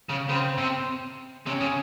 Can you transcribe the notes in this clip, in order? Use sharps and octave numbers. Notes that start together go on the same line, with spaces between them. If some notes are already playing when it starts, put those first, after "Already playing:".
C#3
C#3 C4
C3
C3 C#4
C#3